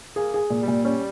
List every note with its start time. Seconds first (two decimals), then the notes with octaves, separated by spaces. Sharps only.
0.16 A#3 G#4
0.34 G#4
0.50 A#2
0.62 G3
0.68 A#2
0.85 G3 C#4